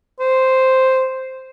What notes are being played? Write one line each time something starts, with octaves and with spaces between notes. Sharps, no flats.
C5